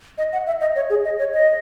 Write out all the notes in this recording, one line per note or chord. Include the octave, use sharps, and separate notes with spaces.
D#5
F#5
E5
D#5
C#5
G#4
D#5
C#5
D#5